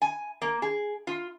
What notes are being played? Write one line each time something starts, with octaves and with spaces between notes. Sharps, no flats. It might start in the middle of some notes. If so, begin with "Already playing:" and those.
G#5
A#3
G#4
F4